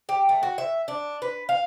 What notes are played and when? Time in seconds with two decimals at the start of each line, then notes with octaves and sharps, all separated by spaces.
0.09 G4
0.29 A3
0.43 F#4
0.58 E5
0.88 D4
1.22 B4
1.49 F5